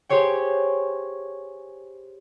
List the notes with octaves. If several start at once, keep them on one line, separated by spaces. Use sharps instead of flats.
G4 G#4 C5 C#5 G5